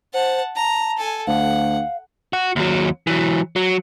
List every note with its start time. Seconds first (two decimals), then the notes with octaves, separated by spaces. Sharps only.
0.14 C5 F#5 A5
0.56 A5 A#5
0.97 A4 G#5
1.27 D2 F5 F#5
2.33 F#4
2.56 D#2 F#3
3.07 E3 F#3
3.56 F#3